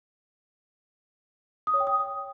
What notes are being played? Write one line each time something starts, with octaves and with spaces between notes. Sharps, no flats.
D#6
C#5
G5
D#6